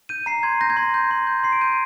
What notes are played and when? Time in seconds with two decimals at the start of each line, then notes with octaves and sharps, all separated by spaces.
0.09 G6 D#7
0.26 A#5 C7
0.43 C6 G#6
0.61 G6 A#6
0.70 G#6
0.77 C6 A#6
0.94 G6
1.11 C6
1.27 G6
1.44 C6 C7
1.52 D7
1.61 G6 D#7